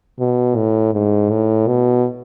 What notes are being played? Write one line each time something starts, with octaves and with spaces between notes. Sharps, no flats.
B2
A2
G#2
A2
B2